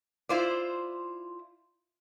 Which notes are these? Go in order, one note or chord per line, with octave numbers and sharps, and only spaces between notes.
E4 F4 C5 D5